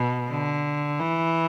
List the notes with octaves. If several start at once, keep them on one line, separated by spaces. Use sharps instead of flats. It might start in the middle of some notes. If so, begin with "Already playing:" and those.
Already playing: B2
D3
E3